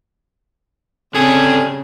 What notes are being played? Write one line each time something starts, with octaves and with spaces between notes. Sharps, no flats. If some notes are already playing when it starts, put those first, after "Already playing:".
C#3 G3 C4 G#4 A4